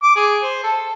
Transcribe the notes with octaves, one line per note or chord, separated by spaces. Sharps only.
D6
G#4
C5
A4